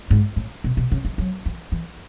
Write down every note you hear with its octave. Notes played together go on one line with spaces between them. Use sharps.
G#2
A2
B2
B2
C#3
E3
F#3
E3
E3